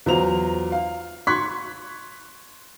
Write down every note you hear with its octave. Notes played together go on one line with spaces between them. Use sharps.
E2 F#3 F4 C5 A#5 F7
F5
C6 C#6 F#6 G#6 B6